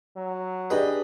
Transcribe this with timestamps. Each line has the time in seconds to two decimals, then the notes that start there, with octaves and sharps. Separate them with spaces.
0.16 F#3
0.70 D4 G4 G#4 B4 D#5 B5